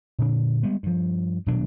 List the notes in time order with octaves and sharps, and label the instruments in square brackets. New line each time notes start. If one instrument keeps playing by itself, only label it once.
[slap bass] A#2 D3 D4
G3 G#3 B3
G2 F3
D#1 B2 F#3 D4